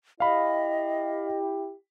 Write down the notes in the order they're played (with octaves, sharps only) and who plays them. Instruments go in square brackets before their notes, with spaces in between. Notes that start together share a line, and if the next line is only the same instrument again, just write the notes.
[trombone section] E4 G4 [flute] D#5 [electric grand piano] F5 B5